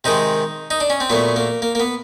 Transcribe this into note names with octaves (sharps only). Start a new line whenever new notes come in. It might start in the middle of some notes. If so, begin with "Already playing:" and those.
C3 D#3 G#3 D#4
D#4
D4
C#4
C4
A#2 F#3 A3 B3
A#3
A#3
A#3
B3